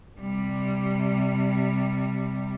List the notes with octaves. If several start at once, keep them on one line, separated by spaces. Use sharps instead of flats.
C3 G3